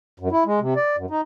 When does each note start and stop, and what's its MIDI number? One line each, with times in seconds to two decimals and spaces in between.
0.20 0.28 42
0.31 0.44 64
0.46 0.60 56
0.60 0.74 48
0.76 0.96 74
0.97 1.06 42
1.10 1.21 63